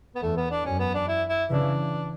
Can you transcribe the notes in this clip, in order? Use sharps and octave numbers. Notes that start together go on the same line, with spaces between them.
B3
E2 A3
B3
D4
F#2 C#4
B3
D4
E4
E4
C#3 E3 D4